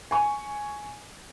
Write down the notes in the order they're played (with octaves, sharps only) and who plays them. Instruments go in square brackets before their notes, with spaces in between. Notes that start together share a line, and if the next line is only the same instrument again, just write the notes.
[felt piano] G#5 C#6